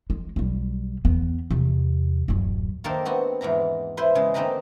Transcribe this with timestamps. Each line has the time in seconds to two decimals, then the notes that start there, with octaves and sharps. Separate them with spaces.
0.10 G#3
0.36 B1 G3
1.05 E2 B3
1.51 E2 C3
2.28 D1 F#2
2.84 D#3 A#3 D4 A4 A#4 C5
3.05 B3 C4 F#4
3.41 E2 G#2 E3 A#5
3.97 E4 B4 C5
4.15 C#3 G#3
4.34 D3 A#3 C4 D#4 B4 A#5